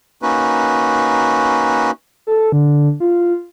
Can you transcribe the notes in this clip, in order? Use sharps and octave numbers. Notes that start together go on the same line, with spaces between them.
A#3 C#4 D#4 F#4 B4
A4
D3
F4